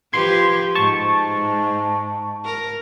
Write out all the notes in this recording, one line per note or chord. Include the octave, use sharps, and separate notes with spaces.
F3 G4 B4 C6 G#6
G#2 A5 C#6
A#4